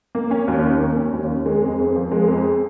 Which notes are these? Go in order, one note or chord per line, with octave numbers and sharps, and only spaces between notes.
A#3
C#4
D#2
D#3
A#3
C#4
D#2
D#3
G#3
F2
F2
F3
G#3
F2